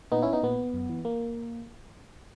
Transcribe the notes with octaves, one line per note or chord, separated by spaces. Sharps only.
A#2 B3 D#4
C#4 E4
B3 D#4
A#2 B3
F#2
E3
A#3